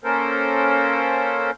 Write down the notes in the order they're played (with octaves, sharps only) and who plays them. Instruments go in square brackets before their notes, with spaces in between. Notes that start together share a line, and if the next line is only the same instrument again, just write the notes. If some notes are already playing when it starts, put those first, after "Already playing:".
[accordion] A#3 C#4 A4 A#4 C5